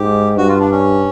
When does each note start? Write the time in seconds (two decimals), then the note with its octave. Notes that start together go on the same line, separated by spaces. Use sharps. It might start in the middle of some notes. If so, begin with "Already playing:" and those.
Already playing: G#2 G4
0.37 G2 F#4
0.49 F4
0.60 D4
0.72 C#4